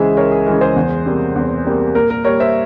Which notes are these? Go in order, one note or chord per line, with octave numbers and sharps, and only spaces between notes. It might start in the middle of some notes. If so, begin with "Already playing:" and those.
Already playing: C#2 C#3 E3 G#3 G#4 C5 E5
C#2 A#4 C#5
G#4
C#3 E3 G#3 A#4
G#4 C5
E2
C3 G3 A#3
E2
C3 G3 A#3
A#2 A#4
A#4
G3 A#3 A#4 C#5
C5 E5